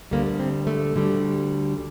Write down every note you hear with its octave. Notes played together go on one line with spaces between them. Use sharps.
D2 D3 G3 A#3
C4
A3
D2 D3 G3